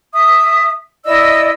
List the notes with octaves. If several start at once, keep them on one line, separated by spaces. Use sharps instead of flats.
E5 D#6
E4 D5 D#5 E6